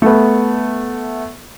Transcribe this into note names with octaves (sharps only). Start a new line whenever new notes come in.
A3 B3